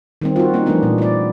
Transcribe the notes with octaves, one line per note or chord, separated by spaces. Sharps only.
D#3 G3 C4
F4 F#4
A#3 C#4 D#4
E3 F3 G3 A3 B3 D4
A#2
E4 D5